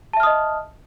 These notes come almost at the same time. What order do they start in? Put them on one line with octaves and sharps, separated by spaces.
A5 E5 F6 D#6 D#5